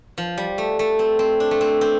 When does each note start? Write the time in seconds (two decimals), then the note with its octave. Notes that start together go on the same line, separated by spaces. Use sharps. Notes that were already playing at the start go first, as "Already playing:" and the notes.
0.18 F3
0.38 G3
0.58 A3
0.79 A3
0.99 C4
1.19 C4
1.40 D4
1.51 A3
1.61 C4
1.81 C4